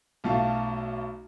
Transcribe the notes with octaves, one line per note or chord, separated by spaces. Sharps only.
B1 A3 F4